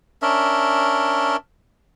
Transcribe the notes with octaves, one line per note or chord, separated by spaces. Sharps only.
C#4 D4 A#4 E5